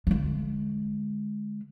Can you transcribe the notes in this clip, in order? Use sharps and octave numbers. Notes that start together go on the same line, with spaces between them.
D3 G#3